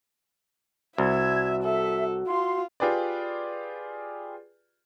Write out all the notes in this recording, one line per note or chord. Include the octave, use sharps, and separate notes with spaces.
C2 F#4 E5 G#6
A4 E5
F4 C6
F4 G4 G#4 B4 D5